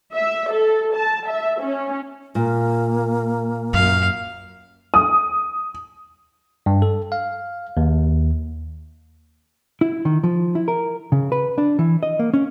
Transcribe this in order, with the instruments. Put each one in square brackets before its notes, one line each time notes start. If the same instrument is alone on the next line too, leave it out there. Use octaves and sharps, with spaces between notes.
[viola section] E5
A4
A5
E5
C#4
[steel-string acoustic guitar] A#2 [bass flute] A#3
[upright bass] F#2 [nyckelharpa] F5
[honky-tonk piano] D#6
[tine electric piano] G2
A4
F5
D#2
[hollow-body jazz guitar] E4
D#3
F3
E4
A#4
C#3
B4
D4
E3
D#5
A#3
C#4